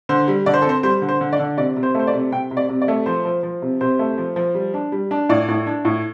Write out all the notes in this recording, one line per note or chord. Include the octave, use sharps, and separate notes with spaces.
D3 C5
G3
D3 D5
C5
A4
C4 C5
G3 C5
D3
C5
D3
D5
D3
C3 D5
C3
C5
A3 C5
D5
C3
C3 G5
C3
D5
C3
D5
A3
F3 C5
F3
F3
C3
C3 C5
A3
F3
F3
G3
D4
G3
D4
A2 D5
A2
D4
A2